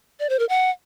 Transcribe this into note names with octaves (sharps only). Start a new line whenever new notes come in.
D5
C5
A#4
F#5